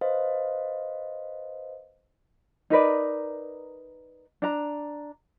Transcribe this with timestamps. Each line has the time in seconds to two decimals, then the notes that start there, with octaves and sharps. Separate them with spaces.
0.01 B4 C5 D#5 F5
2.70 D#4 A#4 B4 D5
4.42 D4 A#5